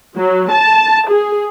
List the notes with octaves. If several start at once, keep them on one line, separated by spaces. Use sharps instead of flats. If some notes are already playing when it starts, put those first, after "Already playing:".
F#3
A5
G#4